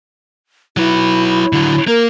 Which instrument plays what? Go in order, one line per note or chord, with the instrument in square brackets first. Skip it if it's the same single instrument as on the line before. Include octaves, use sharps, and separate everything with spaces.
[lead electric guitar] F#3 B4 [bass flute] E4
[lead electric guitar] D3 F#3
[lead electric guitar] A#3 [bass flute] A#4